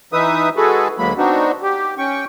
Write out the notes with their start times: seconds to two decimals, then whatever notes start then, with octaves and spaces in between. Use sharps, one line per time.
0.13 E3 D#4 B4 E5 D#6
0.56 G#3 F#4 G#4 A4 B4
0.98 D2 F#3 G#3 A#3 B5
1.18 B3 C4 D4 D#4 F#4
1.62 G4
1.98 C#4 G5 C#6